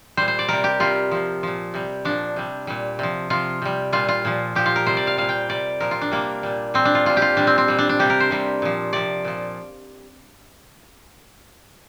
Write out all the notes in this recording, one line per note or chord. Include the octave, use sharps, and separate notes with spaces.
A#2 G3 C5
C5
D5
C3 G3 A#4
G4
C3 G3 F4
C3 F3
A#2 F3
C3 G3
A#2 F3 D4
C3 G3
A#2 G3
C3 F3
C3 F3 F4
C3 G3
A#2 G3 F4
F4
A#2 F3
A#2 F3 G4
F4
A#4
C3 G3 C5
D5
F5
A#2 G3 F5
G5
C3 G3 D5
A#2 F3 A#4
F4
D4
C3 G3 A#3
A#2 G3
A#2 G3 C4
D4
F4
A#2 G3 F4
G4
F4
A#2 G3 D4
C4
C4
A#2 G3
D4
D4
C3 G3 G4
A#4
C5
C3 G3
A#2 F3
C3 F3 D5
A#2 F3